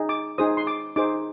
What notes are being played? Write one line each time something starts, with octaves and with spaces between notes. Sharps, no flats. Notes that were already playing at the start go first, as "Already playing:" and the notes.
Already playing: D#4 G#4
D6
D#4 G#4 C5 D#6
C6
D6
D#4 G#4 C5 D6